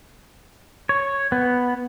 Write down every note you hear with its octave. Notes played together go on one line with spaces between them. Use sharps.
C#5
B3